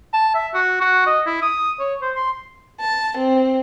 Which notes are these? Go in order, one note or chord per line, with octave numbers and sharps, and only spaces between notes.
A5
E5
F#4
F#4
D#5
E4
D#6
C#5
C5
C6
A5
C4